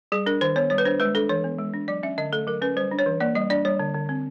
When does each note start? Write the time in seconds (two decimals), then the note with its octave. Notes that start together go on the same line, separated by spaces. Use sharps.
0.12 G3 G#4
0.26 D4 A#4
0.41 D#3 C5
0.56 B3 C#5
0.70 G3 C#5
0.78 B4
0.85 D4 C5
1.00 G#3 B4
1.15 D4 A4
1.29 E3 C#5
1.44 B3
1.59 G#3
1.73 D4
1.88 F#3 D5
2.03 C#4 E5
2.18 D3 D#5
2.32 A3 A4
2.47 F#3 A#4
2.62 C#4 B4
2.77 G3 C5
2.91 D4
2.99 C#5
3.06 E3
3.20 A#3 D5
3.35 G3 D#5
3.50 D4 D5
3.65 G3 C#5
3.79 D3
3.94 D3
4.09 C4